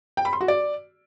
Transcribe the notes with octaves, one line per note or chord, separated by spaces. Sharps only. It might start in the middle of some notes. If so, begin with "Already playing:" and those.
G5
B5
C6
F#4
D5